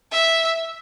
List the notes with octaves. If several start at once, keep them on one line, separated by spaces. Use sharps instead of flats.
E5